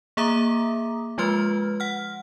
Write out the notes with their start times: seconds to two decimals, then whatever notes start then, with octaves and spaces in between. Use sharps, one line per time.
0.17 A#3 G#4 E5 A#5 D6 D#6
1.18 F3 G#3 F4 B4 C6 F6
1.80 F#5 F6